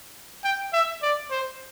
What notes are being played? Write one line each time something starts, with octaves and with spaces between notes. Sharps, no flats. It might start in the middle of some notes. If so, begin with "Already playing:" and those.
G5
E5
D5
C5